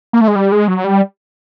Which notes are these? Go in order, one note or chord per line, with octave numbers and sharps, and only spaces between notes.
A#3
A3
G#3
G3
G#3
F#3
G3